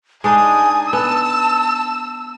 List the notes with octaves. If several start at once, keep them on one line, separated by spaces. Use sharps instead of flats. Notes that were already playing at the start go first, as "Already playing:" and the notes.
G#3 D4 D#4 G#5 D#6
B3 A5 E6